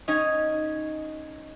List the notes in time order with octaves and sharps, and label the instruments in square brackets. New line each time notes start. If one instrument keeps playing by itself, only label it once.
[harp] C#4 D#4 G#5